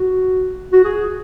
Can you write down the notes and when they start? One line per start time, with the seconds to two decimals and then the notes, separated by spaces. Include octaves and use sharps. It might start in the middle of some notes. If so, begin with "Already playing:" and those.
Already playing: F#4
0.73 F#4
0.84 G#4